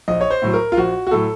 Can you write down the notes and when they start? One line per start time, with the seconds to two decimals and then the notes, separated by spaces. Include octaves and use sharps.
0.08 A#1 D#5
0.21 C#5
0.31 C5
0.42 A2 F#3
0.54 A#4
0.72 F4
0.77 A#1 F#4
1.07 F#4
1.11 A2 F#3 A4